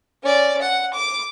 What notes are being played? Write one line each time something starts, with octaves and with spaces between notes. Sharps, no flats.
C#4 D5
F#5
D6